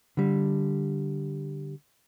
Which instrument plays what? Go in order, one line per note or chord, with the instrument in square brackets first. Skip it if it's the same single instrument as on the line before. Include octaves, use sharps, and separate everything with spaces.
[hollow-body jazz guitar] D3 G3